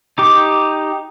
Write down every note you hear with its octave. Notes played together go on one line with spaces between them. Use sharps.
D#4 G4 D6